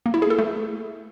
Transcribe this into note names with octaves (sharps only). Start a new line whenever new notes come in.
A#3
E4
G#4
A4
A3